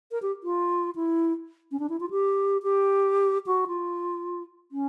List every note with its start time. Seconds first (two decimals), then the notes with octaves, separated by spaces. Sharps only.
0.12 A#4
0.22 G4
0.43 F4
0.96 E4
1.72 C#4
1.80 D4
1.89 E4
2.00 F4
2.11 G4
2.63 G4
3.47 F#4
3.67 F4
4.72 C#4